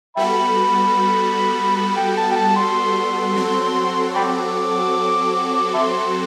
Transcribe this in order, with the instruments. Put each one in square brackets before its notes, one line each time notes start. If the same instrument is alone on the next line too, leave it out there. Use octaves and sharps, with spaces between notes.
[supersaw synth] G3 B3 F#4 A4 [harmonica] E5 G5 B5
[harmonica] B5
G5
A5
G5
A5
C6
[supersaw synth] F#3 C4 F#4 A4
[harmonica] G5 B5 D6
E5 A5 C6